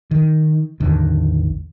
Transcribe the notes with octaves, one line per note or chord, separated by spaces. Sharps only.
D#3
A1 E2 D3 D#3